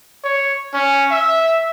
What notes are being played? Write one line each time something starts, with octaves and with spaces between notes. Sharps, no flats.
C#5
C#4
E5